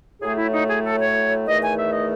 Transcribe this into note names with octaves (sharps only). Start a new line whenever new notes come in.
A2 F#3 A3 G#4
E4
D#4
G#4
A4
C#5
E2 D#3 A3 D#5
G#5
E5
D#5